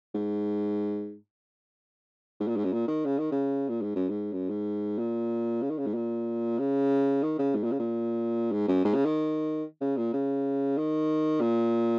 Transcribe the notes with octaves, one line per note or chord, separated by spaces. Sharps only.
G#2
G#2
A#2
G#2
F#2
A#2
D#3
C#3
D#3
C#3
A#2
G#2
F#2
G#2
F#2
G#2
A#2
C#3
D#3
C#3
G#2
A#2
C#3
D#3
C#3
G#2
A#2
C#3
A#2
G#2
F#2
G#2
C#3
D#3
C#3
A#2
C#3
D#3
A#2